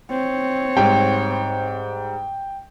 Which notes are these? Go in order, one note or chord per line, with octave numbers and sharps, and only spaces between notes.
C4 C#5
G#2 G3 G5